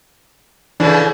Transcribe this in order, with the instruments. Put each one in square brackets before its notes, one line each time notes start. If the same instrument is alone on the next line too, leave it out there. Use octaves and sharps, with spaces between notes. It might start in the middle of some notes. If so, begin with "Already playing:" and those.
[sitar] A2 C#3 [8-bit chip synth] E3 D4